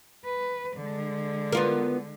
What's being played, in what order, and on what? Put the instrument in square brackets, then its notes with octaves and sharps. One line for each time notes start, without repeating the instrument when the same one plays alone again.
[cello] B4
D3 G#3
[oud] B3 F4 A#4